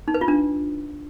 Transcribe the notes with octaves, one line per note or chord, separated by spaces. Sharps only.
D#4
B4
F4
D4